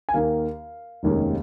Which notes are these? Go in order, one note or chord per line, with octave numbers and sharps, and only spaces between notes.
G#5
D#2 D#3 A#3 F5
F1 D#2 D#3 G#3 C#4